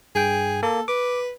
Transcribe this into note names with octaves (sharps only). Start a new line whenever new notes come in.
G2 G#4 G5
A#3 A4
B4 D6